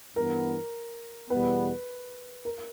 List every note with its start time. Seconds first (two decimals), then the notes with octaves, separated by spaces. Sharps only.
0.16 G2 E3 B3 A#4
1.30 E2 B2 G3 B3 B4
2.45 A#4